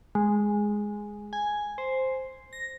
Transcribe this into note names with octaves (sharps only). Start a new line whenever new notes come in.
G#3
G#5
C5
A#6